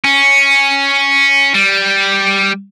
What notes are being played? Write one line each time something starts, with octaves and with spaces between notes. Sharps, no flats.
C#4
G3